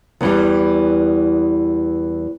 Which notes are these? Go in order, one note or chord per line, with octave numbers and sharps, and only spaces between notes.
E2 E3 G3